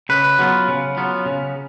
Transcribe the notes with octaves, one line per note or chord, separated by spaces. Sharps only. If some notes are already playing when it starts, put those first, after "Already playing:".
C#3 B4
F#3 B3 F4
C#3
F#3 B3 F4
C#3